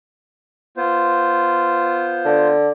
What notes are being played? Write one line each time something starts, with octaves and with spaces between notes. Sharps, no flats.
B3 F4 C5
D3